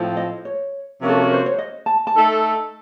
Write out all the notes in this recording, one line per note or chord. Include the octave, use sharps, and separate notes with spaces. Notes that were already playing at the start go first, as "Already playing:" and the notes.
Already playing: A2 F3 C4
D#5
C#5
C3 F3 A#3 C#4 F#4
A4
A#4
C5
C#5
D#5
A5
A5
A3 D#4 A4